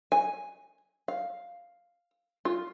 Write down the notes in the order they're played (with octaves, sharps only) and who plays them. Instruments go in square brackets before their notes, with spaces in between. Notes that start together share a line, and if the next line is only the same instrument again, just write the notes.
[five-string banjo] G#5
F5
F4